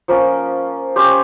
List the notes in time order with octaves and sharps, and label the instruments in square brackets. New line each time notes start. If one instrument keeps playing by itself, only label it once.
[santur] F3 A#3 C#4
C#4 G4 C5